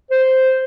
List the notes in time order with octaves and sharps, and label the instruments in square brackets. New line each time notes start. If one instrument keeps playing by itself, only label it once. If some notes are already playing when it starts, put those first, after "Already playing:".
[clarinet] C5